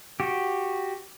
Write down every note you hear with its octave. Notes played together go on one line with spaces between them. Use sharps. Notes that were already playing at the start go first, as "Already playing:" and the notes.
F#4 G4